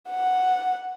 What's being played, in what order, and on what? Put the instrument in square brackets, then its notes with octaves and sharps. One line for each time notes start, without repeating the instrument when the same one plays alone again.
[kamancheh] F#5